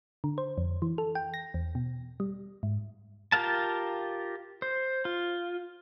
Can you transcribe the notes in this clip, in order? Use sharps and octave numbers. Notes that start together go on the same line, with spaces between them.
D3
C5
F2
E3
A4
G5
A#6
E2
B2
G3
G#2
F4 G4 A#4 F5 A5
C5
F4